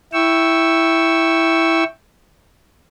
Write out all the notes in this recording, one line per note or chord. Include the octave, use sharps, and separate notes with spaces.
E4 G5 C#6 E6